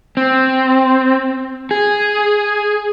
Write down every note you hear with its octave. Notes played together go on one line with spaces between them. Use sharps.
C4
G#4